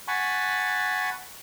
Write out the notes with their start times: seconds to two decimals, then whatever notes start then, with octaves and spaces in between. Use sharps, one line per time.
0.08 F#5 G#5 A5 B5 C#6